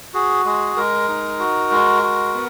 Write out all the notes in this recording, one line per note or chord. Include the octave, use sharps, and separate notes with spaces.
F#4 G#4
G#3 G#4
G#3 A#4
D#4
F#4
G#3
F#4
B3